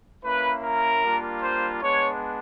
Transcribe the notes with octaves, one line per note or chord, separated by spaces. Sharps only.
A#3 C#4 E4 B4
A#4
G3 A#3 D4 F4
C5
G#3 B3 D4 C#5